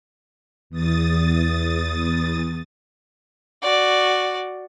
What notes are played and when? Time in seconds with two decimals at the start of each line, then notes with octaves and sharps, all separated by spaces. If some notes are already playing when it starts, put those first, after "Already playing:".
0.70 E2 D#6 A6
3.62 F#4 D5